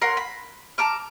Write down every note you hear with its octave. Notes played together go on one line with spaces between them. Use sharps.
A#4 C#5 F#5 C6
B5
A5 A#5 D6 F6